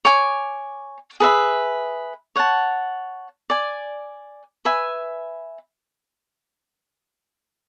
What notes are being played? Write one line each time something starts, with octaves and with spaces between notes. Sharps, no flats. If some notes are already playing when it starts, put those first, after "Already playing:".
C#5 G#5 D6
G#4 B4 E5 B5
C#5 F#5 A5
D5 G#5 D6
B4 E5 G#5